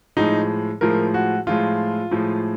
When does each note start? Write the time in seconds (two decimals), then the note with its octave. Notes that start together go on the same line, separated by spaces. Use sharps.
0.17 A2 F3 G#3 D#4
0.81 A2 F3 G#3 A#4
1.14 F#4
1.47 A2 F3 G#3 F4
2.11 A2 F3 G#3